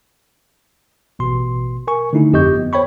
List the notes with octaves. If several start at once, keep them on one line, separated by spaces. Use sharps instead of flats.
A1 B2 C6
A#4 G#5 C#6
D3 A3 D#4 E4
G1 F2 G4 D#5 C#6 G6
B3
C5 C#5 G5 B5 C#6